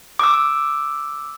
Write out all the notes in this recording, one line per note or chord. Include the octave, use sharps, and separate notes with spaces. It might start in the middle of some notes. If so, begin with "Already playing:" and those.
D6 E6